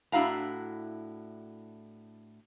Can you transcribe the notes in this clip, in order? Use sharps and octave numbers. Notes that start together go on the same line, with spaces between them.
A2 D4 E4 F#4 F5 A#5